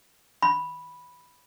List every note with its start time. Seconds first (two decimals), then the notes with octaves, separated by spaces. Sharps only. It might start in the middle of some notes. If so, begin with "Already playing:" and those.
0.42 B5